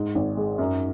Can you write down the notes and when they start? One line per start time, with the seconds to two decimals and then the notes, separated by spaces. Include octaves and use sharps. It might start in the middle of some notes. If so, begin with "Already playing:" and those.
Already playing: G#2
0.15 G#1
0.37 G#3
0.58 F#2